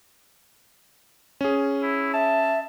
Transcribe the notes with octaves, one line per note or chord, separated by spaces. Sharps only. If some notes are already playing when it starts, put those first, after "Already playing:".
C#4 G#4
E4
E5 A5